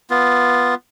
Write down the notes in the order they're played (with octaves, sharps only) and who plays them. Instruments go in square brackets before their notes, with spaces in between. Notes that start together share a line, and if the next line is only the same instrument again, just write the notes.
[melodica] B3 F4